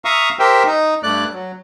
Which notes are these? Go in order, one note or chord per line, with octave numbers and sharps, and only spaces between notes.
E5 F5 A#5 C#6 D#6
G4 A#4 C5 E5 G5
D#4
G2 A3 D5 F#6
F#3